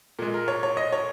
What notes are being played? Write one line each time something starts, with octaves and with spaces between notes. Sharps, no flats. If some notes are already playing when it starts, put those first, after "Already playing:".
A#2 G#3
A#4
C#5
C#5
D#5
C#5